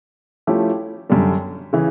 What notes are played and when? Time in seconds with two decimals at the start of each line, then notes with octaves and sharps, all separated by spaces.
0.47 F3 A3 C#4 E4 G4
1.10 F#2 D3 G3
1.73 C#3 E3